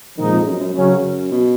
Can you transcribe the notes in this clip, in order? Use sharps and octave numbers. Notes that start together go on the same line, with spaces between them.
A#2 D#3 F3 G#3 D#4
F2
F#2
F#2
F#2 C#3 F#3 C#4
F#2
B2